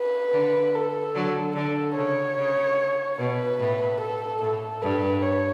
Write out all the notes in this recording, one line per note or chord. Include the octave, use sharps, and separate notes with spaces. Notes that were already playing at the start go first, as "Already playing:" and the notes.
Already playing: B4
D3
A4
D3 F#3
D3 A4
C#3 C#5
C#3
B2 B4
A2
A4
A2 A4
G2 B4
C#5